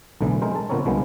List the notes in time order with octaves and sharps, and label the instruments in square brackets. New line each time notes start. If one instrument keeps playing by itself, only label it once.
[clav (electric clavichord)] B1 A2 D3 E3
G#3 C4 A#4 C5
A5
A#2 D3 B3 C4 A#4 C#5
C2 D3 F3 G3 G#3 B3